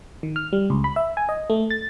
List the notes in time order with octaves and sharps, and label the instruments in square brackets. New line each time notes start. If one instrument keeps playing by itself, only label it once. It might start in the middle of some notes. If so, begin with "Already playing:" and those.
[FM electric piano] D#3
F6
G3
C#2
B5
E5
G#5
D#5
A3
A6